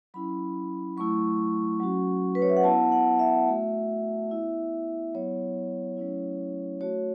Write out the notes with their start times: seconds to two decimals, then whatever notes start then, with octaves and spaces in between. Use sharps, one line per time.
0.14 F#3 C#4 E4 B5
0.97 F#3 A3 E4 C#6
1.80 F#3 C#4 F#4
2.35 B4
2.42 C#5
2.50 E5
2.57 F#5
2.64 B3 E4 A5
2.92 F#5
3.19 E5
3.48 A3 F#4
4.31 B3 E4
5.14 F#3 B3 E4 C#5
5.97 F#3 A3 C#4 E4
6.81 A3 F#4 C#5